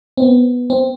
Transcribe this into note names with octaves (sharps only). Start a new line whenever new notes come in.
C4
B3
C4